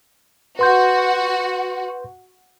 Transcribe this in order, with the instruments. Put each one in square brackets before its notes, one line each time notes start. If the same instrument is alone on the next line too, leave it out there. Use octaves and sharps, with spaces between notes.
[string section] F#4 [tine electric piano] B4 C6 G6